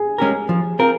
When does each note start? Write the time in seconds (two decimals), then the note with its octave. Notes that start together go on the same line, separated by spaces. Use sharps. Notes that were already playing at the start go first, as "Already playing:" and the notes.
Already playing: G#4
0.18 G#3 C#4 G4 A#4
0.49 F3
0.79 C4 F4 A#4